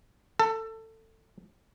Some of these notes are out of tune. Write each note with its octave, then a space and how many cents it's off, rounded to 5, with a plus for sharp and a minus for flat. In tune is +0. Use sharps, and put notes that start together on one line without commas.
A4 +20